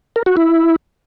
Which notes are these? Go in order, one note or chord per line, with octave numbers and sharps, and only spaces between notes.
A#4
F#4
E4